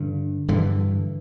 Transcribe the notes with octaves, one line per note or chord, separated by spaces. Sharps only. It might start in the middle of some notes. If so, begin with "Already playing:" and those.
Already playing: G2 D3
G2 D3 E3